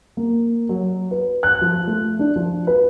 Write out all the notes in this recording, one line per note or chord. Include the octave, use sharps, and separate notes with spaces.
A#3
F#3
B4
F#6
F3
A3
D4
F3
B4